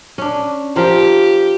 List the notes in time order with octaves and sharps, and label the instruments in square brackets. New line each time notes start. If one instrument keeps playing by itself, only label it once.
[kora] C#4 D4
[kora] F3 A#4 C5 [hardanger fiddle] G4